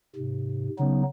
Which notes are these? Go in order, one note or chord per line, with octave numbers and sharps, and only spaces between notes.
G#2 C3
C#3 F#3 B3 D#4